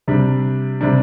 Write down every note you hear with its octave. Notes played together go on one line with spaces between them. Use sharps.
C3 G3 D4
C3 G3 D4